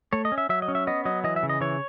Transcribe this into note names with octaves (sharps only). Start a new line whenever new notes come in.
A3 C#5
D#5
C#4
E5
F#3 E5
D#5
C#4
E5
B3 D#5
F#3 D#5
E3 D#5
E5
C#3
D#5
E3 C#5